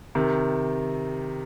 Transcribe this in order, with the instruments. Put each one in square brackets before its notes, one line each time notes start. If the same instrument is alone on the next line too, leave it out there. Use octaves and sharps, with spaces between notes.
[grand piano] C3 D#3